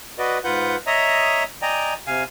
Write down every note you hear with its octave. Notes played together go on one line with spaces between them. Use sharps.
F#4 B4 D5 D#5
G#2 F4 B4 F#5 G6
C#5 D#5 E5 A#5 D#6
D5 D#5 G5 G#5 A#5
C3 F5 G#5